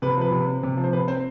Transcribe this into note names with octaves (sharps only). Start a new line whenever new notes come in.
C3 B4
F3 B4
C3
C4
C3
F3
C5
C3 B4
C4 C5